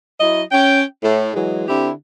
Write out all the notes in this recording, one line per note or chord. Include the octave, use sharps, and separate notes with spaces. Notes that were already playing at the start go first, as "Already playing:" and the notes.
F#3 E4 D#5
C#4 G5
A2
E3 F#3 G#3
D3 C4 E4 G4